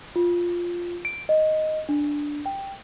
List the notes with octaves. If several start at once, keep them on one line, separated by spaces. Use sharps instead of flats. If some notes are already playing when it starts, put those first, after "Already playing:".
F4
D7
D#5
D4
G5